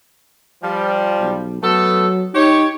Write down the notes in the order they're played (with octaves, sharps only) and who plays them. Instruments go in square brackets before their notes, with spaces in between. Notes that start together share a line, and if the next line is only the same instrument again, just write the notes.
[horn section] F3 G3
[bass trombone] B1
[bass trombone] F#3 [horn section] A3 B3 A4
[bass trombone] D#4 [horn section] G4 C#5